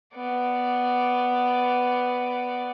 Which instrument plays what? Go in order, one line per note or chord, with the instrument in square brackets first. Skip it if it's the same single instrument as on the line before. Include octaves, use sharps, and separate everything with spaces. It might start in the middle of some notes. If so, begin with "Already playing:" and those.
[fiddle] B3 D5